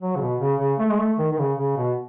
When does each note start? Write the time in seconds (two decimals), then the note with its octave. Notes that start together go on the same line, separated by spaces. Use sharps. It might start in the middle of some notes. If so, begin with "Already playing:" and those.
0.01 F#3
0.16 C#3
0.21 B2
0.40 C#3
0.59 C#3
0.79 A3
0.90 G#3
0.98 A3
1.19 D#3
1.32 D#3
1.38 C#3
1.58 C#3
1.77 B2